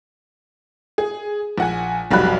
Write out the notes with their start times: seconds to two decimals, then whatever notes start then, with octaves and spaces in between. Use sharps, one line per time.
0.98 G#4
1.58 A#1 F#5 G#5
2.11 F1 B1 G3 F#4 B5 F#6